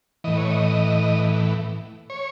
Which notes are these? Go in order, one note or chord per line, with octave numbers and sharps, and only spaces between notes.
A2 E3 D#5
C#5
D#5
C#5